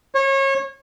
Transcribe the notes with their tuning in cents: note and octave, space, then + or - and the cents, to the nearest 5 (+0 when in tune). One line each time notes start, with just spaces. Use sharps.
C#5 -30